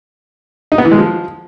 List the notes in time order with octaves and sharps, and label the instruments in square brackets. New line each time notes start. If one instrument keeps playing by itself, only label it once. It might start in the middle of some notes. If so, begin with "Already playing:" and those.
[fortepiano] D#4
B3
E3
G#3
F3